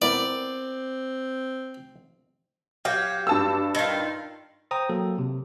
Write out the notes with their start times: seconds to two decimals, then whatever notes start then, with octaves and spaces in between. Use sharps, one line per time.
0.02 B3 C4 E4 A#4 D5
2.85 F#3 G4 F5
3.27 G2 A5 E6
3.75 D#3 F4
4.71 C5 G5 A#5 D#6
4.89 F#3 A#3 A4
5.18 C3